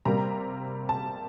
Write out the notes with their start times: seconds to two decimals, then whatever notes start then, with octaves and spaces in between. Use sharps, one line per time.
0.05 C3 G3 A#3 A#5
0.89 A5